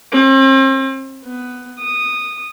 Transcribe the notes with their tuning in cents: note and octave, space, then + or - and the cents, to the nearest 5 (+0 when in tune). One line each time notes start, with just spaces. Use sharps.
C4 +40
B3 +10
D#6 -10